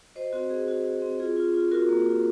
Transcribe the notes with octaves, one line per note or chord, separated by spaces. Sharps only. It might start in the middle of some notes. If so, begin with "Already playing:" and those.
F#4 C5 D#5
C4 F#4
C4 G#4
C4 F#4
F#4
C4
F4 G#4
F4
F4
F4 F#4 A#4
A#3
F4